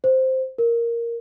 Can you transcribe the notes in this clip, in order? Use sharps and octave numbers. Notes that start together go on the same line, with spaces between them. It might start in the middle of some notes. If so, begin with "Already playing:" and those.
C5
A#4